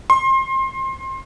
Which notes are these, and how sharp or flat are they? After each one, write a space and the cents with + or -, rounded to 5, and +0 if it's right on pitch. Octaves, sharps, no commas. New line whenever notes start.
C6 +25